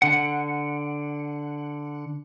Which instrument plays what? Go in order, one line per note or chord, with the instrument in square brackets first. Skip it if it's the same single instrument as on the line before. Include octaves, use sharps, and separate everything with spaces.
[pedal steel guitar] D3 F#5